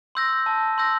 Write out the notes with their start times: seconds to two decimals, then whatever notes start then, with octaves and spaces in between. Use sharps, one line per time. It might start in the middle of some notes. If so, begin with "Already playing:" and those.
0.15 C6 E6 G6 A#6
0.46 A5
0.78 C6 E6 G6 A#6